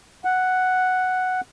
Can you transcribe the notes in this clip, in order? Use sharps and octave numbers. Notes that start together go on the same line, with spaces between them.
F#5